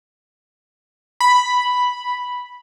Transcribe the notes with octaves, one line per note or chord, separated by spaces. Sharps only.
B5